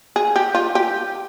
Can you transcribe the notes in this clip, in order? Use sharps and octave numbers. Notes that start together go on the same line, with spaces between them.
G#4
G4
F4
G4